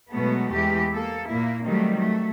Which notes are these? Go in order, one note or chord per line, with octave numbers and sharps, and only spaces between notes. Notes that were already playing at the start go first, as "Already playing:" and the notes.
B2 F#3 G#3 A3 B3
E2 E3 G#3 G4
A#3 A4
A#2 A#3 E4
D#3 F#3 G3 A3 C4
F#3 A3